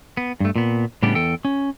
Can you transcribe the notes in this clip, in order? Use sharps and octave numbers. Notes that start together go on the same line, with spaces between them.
B3
G2 A3
A#2 B3
A2 C#3 G3 B3 D4 G4
E2 A4 G5
C#4